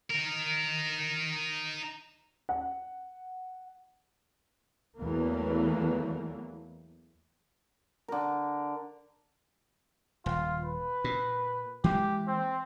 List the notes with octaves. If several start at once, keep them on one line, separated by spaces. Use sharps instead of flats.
D#4 A#4
F#5
E2 E3 F#3 A3 A#3
D3 A#4
D#1 F4
B4
A#2
E3 G#3 A#3 G4
C4